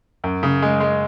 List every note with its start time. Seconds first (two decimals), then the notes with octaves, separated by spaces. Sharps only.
0.24 F#2
0.43 C#3
0.62 G#3
0.80 G#3